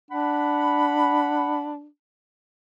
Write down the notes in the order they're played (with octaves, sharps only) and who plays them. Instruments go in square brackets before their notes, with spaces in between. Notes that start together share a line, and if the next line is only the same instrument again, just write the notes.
[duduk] D4 [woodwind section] F#5 B5